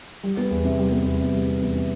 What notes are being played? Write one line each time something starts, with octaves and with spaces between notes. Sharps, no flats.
G3
B3
E2
C3
G3
B3
E2
C3
G3
B3
E2
C3